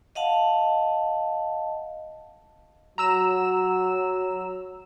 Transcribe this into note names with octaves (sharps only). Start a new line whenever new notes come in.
D#5 F5 F#5 A5
F#3 A#5 E6 E7